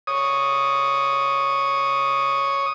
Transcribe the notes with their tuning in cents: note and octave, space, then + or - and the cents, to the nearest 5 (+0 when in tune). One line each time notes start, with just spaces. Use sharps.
C#5 +0 D#6 +0